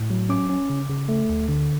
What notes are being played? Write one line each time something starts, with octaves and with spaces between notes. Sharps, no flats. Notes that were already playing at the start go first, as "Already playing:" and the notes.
Already playing: A2
F#3
C#4 D6
C#4
C#3
C#3
A3
D2
D3